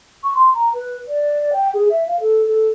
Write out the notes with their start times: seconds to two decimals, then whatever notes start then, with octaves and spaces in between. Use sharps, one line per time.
0.24 C#6
0.35 C6
0.55 A#5
0.74 B4
1.08 D5
1.53 G5
1.74 G#4
1.90 E5
2.08 F5
2.21 A4
2.47 A4